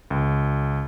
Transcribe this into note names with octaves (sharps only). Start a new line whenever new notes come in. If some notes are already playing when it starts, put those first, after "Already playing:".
C#2